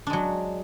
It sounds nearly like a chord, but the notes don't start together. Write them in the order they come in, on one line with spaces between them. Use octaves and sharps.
D4 G#3 F#3